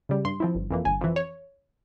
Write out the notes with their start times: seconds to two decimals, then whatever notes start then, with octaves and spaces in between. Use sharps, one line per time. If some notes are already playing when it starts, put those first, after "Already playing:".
0.09 C#3 G3
0.25 G2 C6
0.40 F3 C4 E4
0.55 G1
0.70 F2 E3 A#3
0.85 G1 G#5
1.01 F2 E3
1.16 C#5